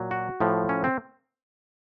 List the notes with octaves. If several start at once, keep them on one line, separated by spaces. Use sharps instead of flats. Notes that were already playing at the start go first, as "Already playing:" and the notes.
Already playing: A#2 F#3
F#4
A2 F3
C#4
C4